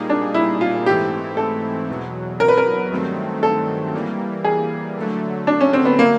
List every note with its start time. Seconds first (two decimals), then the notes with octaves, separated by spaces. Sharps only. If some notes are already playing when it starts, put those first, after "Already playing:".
Already playing: A#2 G3 A#3 D#4 G#4
0.10 D4
0.34 E4
0.61 F4
0.86 G#2 E3 A3 C4 E4 G4
1.37 A4
1.89 E2 B2 F#3
2.40 A#4
2.48 B4
2.58 A#4
2.91 G2 D#3 F#3 A3 C4
3.43 A4
3.94 E3 G3 A#3
4.44 G#4
4.97 D3 F#3 A3
5.47 D4
5.61 C#4
5.73 C4
5.85 B3
5.99 A#3